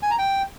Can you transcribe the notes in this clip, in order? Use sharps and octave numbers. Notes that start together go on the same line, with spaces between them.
G#5
A#5
G5